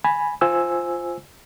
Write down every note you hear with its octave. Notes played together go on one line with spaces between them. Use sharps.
G#5 B5
F4 C5 G#5 E6